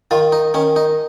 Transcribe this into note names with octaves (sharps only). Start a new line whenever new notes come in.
D#3 F4
D#4
D#3 C#4
D#4